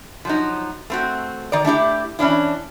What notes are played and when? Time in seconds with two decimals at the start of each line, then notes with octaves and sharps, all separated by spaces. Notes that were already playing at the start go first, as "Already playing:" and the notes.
0.25 F3 F#3 D#4
0.90 A3 C4 F#4
1.52 D#3 D5
1.64 A3 D4 E4 G4
2.19 E3 C#4 D4 E4